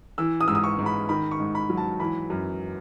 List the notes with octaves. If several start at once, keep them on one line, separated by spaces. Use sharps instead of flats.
E3 E6
D#6
G#2 E6
D#6
C#6
G#2
B5
D#3 B5
C#6
G#2
B5
F#3
A5
E3 B5
F#2